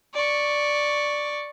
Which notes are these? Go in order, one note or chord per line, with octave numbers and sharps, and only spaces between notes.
D5 C#6